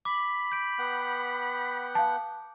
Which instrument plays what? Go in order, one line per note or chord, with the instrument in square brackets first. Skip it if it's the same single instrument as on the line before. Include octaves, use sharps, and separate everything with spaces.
[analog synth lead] B5 [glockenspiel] D6
[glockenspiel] G6 D7
[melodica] B3 F#5 G5
[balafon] F5 A5